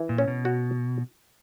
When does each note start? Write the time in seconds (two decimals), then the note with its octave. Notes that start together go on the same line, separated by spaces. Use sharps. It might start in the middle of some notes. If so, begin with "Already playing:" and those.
Already playing: E3
0.09 A#2
0.18 C#4
0.28 B2
0.45 F#4